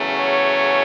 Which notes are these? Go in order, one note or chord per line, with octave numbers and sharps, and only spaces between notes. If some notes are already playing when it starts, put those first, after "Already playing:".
Already playing: E2 C#3 F#3 A3 C#4
C#5